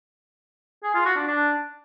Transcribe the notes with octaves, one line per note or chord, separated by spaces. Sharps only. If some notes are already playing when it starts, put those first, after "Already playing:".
G#4
F4
F#4
D4
D4